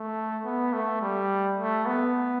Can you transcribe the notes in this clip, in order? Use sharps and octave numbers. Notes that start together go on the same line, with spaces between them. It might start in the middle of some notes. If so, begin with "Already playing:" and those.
Already playing: A3
B3
A3
G3
A3
B3